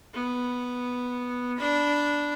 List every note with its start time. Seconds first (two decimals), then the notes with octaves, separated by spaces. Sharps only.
0.14 B3
1.57 D4 B5